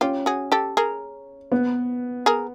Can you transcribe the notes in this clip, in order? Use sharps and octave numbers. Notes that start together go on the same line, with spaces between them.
C#4 F4 G4
F#4 G#4
G4 A4
G#4 A#4
B3
G#4 A#4